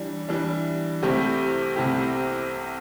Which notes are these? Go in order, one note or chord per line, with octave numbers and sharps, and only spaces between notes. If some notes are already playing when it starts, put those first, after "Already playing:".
Already playing: E3 G3 D4
E3 G3 D4
C2 C3 A3 E4 G4
C2 C3 A3 E4 G4